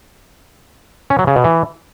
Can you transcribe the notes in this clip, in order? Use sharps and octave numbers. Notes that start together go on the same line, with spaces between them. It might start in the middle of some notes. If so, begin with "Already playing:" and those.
C#4
F#3
C#3
B2
E3